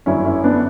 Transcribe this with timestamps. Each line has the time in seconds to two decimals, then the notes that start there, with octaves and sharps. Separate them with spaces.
0.06 G1 F#2 D3 C#4 E4
0.25 C#4 E4
0.44 B3 D4